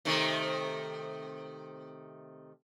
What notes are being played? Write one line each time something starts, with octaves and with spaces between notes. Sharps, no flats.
C3 D#3 A3